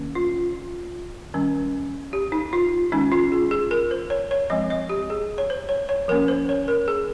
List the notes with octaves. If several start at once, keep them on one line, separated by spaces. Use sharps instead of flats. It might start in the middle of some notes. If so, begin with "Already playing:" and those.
Already playing: D#3 A#3 C#4
F4
D#3 G3 C#4
G4
D#4
F4
D#3 G#3 C#4 D#4
F4
G#4
G#4
A#4
C5
C#5
C#5
F3 G#3 C4 D#5
D#5
G4
G#4
C#5
C5
C#5
C#5
F3 A#3 C#4 A#4
C5
C#5
A#4
G#4